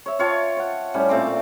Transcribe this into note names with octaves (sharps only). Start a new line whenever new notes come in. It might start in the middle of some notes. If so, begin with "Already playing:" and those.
C#5 E5
F4 C#5 G5 A5
C#5 F#5
A2 G3 C#4
A#2 A3 C4 D6
D5